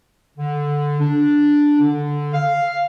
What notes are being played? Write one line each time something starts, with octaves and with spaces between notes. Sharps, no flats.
D3
D4
D3
F5